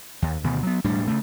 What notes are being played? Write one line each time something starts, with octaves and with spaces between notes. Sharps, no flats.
D#2
D2 B2 D#3
F#3 B3
E1 A2 G3 D4
C#3 A3